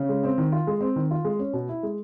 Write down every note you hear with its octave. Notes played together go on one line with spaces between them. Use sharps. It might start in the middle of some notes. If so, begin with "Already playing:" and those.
Already playing: C#3
G#3
C4
D#3
F4
G#3
C4
D#3
F4
G#3
C#4
B2
E4
G#3